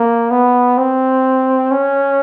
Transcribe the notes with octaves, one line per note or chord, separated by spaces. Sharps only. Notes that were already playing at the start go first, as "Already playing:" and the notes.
Already playing: A#3
B3
C4
C#4